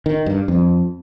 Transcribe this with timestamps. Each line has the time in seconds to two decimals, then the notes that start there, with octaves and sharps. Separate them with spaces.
0.06 D#3
0.26 G2
0.48 F2